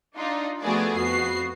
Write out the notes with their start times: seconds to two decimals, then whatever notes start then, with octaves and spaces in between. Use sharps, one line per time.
0.17 D4 D#4 F4
0.62 F3 A3 B3 F#4 G#4 D5
0.96 F2 B3 F#4 C7